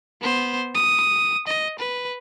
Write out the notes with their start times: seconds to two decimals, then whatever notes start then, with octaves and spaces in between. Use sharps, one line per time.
0.22 B3 C5
0.75 D#6
1.48 D#5
1.79 B4